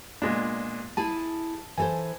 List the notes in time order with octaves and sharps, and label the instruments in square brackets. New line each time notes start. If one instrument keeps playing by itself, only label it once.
[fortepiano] A#2 G#3 D4 [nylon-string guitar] B3
[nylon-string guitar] E4 G#4 G#5 [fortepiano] A5
[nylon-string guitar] E3 A4 C5 [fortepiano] G#5